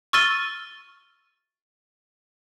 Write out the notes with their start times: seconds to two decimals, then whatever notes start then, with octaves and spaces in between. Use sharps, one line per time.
0.13 C#6 E6 F6 A6 D#7 G7